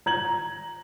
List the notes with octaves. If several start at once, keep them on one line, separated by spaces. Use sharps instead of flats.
A#5 G#6 F#7